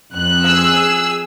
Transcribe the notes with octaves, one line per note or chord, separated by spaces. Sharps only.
F2 F#6
G#4 E6